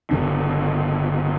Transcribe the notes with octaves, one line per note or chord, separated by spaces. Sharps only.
G1 D#2 C#3 D4